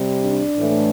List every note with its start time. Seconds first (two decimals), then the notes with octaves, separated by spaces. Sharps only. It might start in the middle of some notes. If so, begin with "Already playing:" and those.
Already playing: C3 G3
0.22 D4
0.57 A2 E3 A3